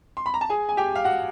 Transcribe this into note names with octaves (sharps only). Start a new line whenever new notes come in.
C6
B5
A#5
A5
G#4 G#5
G#5
G4 G5
F5
F#4 F#5